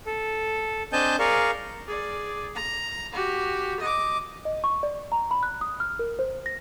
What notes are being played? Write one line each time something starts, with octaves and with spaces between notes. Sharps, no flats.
A4
C4 D4 D#5 G#5 A5 G6
G#4 A#4 D5 F5 C#6
G#4 D5
A#5
F#4 G4
D#5 D6
D#5
C#6
D5
A#5
B5
F#6
D#6
F6
A#4
C5
A#6